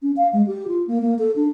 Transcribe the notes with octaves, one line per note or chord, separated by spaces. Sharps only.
C#4
F5
G#3
G4
F4
A#3
A#3
A4
D4